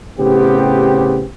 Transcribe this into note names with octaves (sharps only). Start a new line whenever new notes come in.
A2 C#3 B3 C4 G4